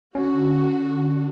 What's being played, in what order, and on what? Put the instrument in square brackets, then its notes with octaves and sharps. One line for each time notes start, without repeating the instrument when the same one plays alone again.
[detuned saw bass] D3 [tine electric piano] C#4 [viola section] F#4